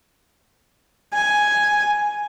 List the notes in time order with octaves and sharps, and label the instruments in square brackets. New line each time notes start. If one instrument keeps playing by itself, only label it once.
[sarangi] G#5